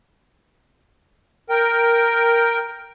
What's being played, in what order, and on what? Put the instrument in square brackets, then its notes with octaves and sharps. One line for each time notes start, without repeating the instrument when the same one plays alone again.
[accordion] A#4 G5